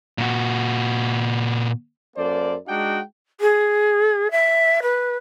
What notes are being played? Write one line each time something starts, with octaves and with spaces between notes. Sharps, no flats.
A#2 F#4
F#2 A#3 A4 C5 D5
G#3 D4 D#4 F#4 F#5 G5
G#4
E5
B4